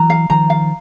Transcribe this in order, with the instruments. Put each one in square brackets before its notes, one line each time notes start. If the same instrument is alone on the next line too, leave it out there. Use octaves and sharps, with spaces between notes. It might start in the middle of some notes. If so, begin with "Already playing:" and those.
Already playing: [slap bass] E3 F#3 [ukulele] A#5
[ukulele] F5
[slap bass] D#3 F3 [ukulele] A#5
[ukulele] F5